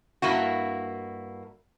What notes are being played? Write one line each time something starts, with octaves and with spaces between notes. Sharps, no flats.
G2 A#3 E4 F#4